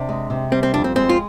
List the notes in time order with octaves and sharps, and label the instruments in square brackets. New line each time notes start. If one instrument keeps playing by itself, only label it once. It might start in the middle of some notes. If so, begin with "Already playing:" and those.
Already playing: [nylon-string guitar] C3 [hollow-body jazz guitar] D4
[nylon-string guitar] G#3
C3
[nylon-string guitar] G3 [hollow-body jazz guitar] C4
[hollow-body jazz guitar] C4
[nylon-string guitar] F2 [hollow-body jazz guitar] D4
[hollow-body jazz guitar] C4
[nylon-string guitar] G#3 [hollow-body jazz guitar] C4
[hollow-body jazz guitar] F4